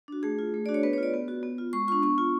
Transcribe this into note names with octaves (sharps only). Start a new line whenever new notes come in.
D4 F#4
A3 G#4
F4
A3
D4 F#4 D5
C#5
B3 B4
C#5
F4 D5
B3
F#4
B3
F4
G#3 C#6
D4 F4 C#6
B3 C#6
F4